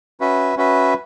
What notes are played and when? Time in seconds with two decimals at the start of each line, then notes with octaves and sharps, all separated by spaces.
0.20 C#4 F#4 B4 E5
0.57 C#4 F#4 B4 E5